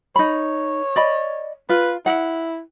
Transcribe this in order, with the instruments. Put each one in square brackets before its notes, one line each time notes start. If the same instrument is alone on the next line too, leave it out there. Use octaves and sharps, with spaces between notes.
[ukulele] D#4 B5 [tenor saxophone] C#5
[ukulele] D5 D#5 B5
[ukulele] F4 [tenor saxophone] B4
[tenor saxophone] E4 [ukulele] F#5